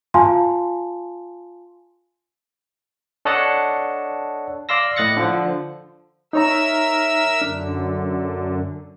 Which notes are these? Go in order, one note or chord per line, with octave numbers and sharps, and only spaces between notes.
F4 F5 G#5 A5 C6
D4 A4 C#5 D#5 F#5 A5
D5 F5 C6 E6 A#6
A2 D#5 F#6 A6 A#6 C#7
D3 F3
D#4 A#4 C#5 E5 A#5 E6
F#2 D3 D4